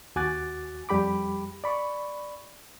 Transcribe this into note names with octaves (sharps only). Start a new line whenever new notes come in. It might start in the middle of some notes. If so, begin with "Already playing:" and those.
D#2 F#4 G#5 D6 F#6 A6
F2 G3 G4 B5 D6
D5 B5 C#6